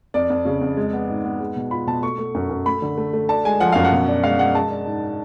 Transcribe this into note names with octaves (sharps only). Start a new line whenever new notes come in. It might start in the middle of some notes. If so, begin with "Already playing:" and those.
F2 D5
F2
C#3
F2
G#3
B3
G#2
B3
G#3
B2
F4 B5
B2 A5
A3 C#6
A3
F#2
F#2
A3 B5
D3
A3
A3
D4 A5
G#3 G#5
F3 F#5
F#2 F5
F#5
B2
D4
G#3 F5
G#3 F#5
G#3 A5
D4
G#2